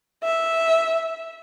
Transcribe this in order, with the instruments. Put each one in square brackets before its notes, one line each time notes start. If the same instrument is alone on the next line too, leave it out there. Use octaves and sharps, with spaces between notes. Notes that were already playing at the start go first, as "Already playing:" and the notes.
[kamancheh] E5